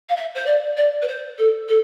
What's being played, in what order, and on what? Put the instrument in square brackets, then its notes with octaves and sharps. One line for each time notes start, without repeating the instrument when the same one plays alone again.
[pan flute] F5
E5
C5
D5
D5
B4
C5
A4
A4